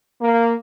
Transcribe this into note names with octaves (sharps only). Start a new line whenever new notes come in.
A#3